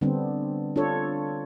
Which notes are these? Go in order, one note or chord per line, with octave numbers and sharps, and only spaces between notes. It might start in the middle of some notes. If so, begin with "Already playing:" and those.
D3 G3 B3 C4 D4
D4 F4 A4 C#5